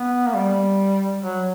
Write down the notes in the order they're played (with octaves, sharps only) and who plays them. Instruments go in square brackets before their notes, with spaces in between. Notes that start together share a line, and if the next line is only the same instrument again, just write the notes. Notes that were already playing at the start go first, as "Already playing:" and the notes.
Already playing: [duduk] B3
A#3
G3
F#3